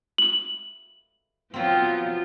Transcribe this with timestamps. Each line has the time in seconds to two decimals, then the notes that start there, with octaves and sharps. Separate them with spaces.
0.18 F#7
1.54 F3 F#3 B3 C4 F4